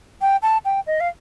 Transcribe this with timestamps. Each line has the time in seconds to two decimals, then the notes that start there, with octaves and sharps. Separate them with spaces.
0.21 G5
0.42 A5
0.65 G5
0.87 D#5
1.00 F5